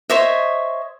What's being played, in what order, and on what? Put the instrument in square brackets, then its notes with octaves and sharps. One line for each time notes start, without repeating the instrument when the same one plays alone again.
[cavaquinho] C5 C#5 D#5 E5